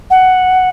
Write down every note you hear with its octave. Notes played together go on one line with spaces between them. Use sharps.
F#5